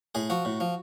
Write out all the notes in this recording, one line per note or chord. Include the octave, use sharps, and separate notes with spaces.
A2 G#4
F3 F#4
A2
F3